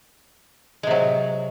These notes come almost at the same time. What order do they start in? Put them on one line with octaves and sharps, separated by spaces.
G#3 C3 F#3